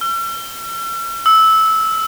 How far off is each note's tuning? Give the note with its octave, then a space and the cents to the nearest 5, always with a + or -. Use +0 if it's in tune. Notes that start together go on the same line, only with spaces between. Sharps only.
E6 +45
E6 -15